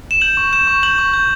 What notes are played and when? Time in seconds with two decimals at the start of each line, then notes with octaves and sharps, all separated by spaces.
0.11 E7
0.21 G6 F#7
0.37 C#6
0.53 G6 E7
0.67 C#6
0.83 G6 F#7
0.98 C#6
1.14 G6